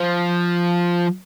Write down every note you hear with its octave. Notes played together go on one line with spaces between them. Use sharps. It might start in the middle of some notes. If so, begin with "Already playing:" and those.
Already playing: F3